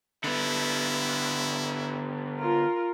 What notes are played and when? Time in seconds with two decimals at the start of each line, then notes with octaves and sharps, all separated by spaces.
0.24 D3 B3 E4
2.40 F4 A#4